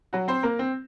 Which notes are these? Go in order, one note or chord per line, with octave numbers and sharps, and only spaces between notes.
F#3 F#4
C4 C5
A#3 A#4
C4